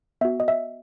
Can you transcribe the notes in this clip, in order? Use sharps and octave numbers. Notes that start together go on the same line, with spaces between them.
B3 F#4 E5
D#5
E5